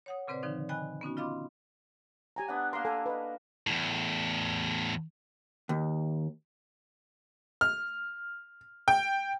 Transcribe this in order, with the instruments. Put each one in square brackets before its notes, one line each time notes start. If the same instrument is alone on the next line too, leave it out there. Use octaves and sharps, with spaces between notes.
[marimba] C#5 F#5 D#6
A#2 C#3 C4 B4 C5 D5
D3 D#3 F3 C4 D#4
D#5 G5 G#5 B5 F#6
B3 C#4 D#4 F#4
F4 D#5 F5 B5 C6 D6
[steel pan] G4 G#5 A#5
[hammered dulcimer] B3 D4 F#5
[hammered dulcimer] A#3 A#4 [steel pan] C6
[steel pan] A4 G#5
B4 D#5
[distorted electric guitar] E2 A2
[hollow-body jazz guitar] D#2
[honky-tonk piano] F6
G5